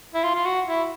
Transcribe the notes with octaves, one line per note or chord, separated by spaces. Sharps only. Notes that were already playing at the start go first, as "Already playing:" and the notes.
E4
F4
F4
F#4
E4